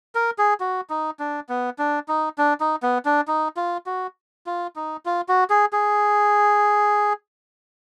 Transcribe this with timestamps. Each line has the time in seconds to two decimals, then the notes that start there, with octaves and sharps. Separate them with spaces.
0.15 A#4
0.38 G#4
0.60 F#4
0.90 D#4
1.19 D4
1.49 B3
1.79 D4
2.08 D#4
2.38 D4
2.60 D#4
2.83 B3
3.05 D4
3.28 D#4
3.57 F4
3.86 F#4
4.46 F4
4.76 D#4
5.06 F4
5.29 F#4
5.50 G#4
5.73 G#4